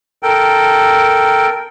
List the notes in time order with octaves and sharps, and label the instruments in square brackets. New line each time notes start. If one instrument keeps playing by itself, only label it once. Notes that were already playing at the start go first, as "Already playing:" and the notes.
[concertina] A4 A#4 G5